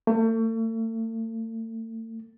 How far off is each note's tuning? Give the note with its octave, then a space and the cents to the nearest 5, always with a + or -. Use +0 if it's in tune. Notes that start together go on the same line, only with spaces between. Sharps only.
A3 +40